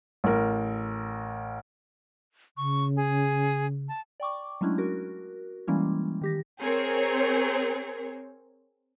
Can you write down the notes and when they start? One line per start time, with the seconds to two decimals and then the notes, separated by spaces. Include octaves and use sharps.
0.24 A1 A#4
2.57 C#3 C#6
2.96 G#4
3.89 A5
4.20 D5 G5 C#6 D6
4.61 F#3 G#3 A3 C#4 D4 E4
4.78 F#4 A#4
5.67 E3 G3 G#3 A#3 C#4 E4
6.21 D#3 G4 A#6
6.61 C4 G#4 A#4 C#5